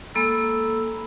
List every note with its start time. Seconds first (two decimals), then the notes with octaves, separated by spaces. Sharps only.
0.14 G#3 A#3 A4 B5 E6